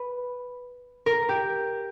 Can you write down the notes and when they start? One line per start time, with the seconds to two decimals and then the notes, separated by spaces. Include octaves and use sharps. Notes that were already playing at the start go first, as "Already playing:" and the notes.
Already playing: B4
1.06 A#4
1.29 G4